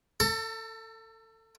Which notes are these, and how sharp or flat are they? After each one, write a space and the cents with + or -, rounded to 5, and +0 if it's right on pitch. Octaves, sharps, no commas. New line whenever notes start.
A4 +25 A#5 -45